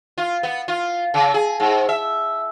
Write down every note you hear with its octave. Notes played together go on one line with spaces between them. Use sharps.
F4
B3
F4
C#3
G#4
G#2
E5